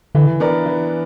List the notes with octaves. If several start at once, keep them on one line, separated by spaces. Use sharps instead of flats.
D3 E3
B3 D4 A#4 D5
E3